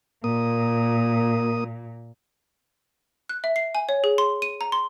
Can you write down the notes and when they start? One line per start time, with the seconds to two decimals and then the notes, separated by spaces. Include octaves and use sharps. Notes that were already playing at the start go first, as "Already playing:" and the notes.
0.24 A#2 A#3 D#6
3.29 F#6
3.44 E5
3.56 C7
3.75 G#5
3.89 C#5
4.04 G#4
4.18 C6
4.42 D#7
4.61 A#5
4.72 C6